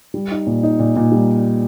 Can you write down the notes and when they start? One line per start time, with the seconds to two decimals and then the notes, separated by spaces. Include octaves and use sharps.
0.14 G3
0.31 D#4
0.47 A#2
0.63 D#4
0.79 A#2
0.96 A#2
1.12 G3